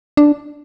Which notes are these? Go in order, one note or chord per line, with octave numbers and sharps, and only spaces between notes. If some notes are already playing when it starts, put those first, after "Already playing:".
D4